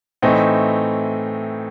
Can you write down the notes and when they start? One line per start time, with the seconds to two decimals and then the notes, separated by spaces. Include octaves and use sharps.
0.22 A2 E3 A3 C4 D#4